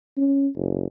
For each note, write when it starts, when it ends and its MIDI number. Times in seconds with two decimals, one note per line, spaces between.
0.17 0.47 61
0.56 0.86 30